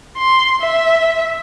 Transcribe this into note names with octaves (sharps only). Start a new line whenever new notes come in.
C6
E5